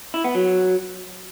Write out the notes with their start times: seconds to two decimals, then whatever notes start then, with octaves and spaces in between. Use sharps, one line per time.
0.14 E4
0.24 B3
0.35 F#3